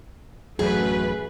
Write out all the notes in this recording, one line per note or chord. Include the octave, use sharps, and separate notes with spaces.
A1 F#2 F#3 A3 G#4 B4